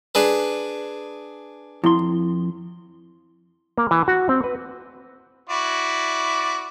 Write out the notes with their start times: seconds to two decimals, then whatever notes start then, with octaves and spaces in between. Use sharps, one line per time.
0.15 D4 G#4 B4
1.84 F2 E4 C6
3.78 A#3
3.91 E3
4.08 F#4
4.29 C4
4.44 B4
5.49 E4 F#4 D5